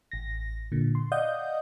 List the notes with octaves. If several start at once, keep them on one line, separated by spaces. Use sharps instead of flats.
A1 A#6
A#2 D3
C6
D5 D#5 F5 F#5 D#6 G6